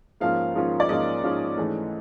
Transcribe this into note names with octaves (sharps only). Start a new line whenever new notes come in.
G#2 F3 A#3 C#4 F4 F5
G#2 F3 A#3 C#4 F4
D5
G#2 F3 A#3 C#4 F4 D#5
G#2 F3 A#3 C#4 F4
G#2 E3 A3 C#4